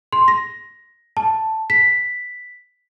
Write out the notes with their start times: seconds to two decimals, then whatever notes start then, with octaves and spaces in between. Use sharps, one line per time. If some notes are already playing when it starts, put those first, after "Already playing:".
0.13 C6
0.28 A#6
1.17 A5
1.70 B6